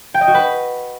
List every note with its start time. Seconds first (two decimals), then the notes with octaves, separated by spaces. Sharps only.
0.14 G5
0.21 D#5
0.28 F#4
0.34 B4